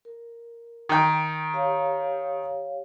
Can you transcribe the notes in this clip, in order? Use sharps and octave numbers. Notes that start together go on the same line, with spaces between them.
A#4
D#3 G5
G4 C#5 F5